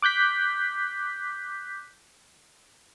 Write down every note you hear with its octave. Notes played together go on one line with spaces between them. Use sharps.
D6 F#6 G6 B6